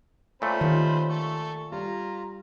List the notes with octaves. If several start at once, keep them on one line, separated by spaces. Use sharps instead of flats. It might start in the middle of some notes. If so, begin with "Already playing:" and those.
A#2 A3 C#4 C5 B5
D#3 F4 G4
A4 C#6
G3 F4 A#5